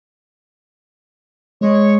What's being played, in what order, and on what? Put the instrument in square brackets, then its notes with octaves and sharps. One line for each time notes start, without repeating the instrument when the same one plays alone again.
[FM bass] G#3 [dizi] C#5